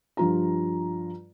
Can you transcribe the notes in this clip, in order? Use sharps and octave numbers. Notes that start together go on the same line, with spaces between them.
G2 F3 F4 A#5